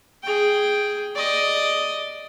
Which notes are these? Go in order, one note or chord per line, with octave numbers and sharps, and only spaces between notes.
G#4 G5
D5 D#5